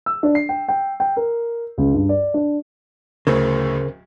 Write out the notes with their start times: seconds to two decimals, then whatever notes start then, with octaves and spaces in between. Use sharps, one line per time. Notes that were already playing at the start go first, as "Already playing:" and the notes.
0.06 E6
0.23 D4
0.35 C7
0.49 G5
0.68 G5
1.00 G5
1.16 A#4
1.78 C#2
1.94 G2
2.09 D5
2.34 D4
3.27 D1 D2 A2 C#3 A#4 C5